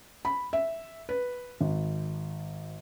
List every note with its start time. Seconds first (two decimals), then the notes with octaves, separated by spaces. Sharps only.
0.25 B5
0.53 E5
1.09 B4
1.61 G#1